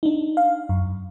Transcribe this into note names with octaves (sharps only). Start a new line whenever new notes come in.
D4 D#4
F5
F#2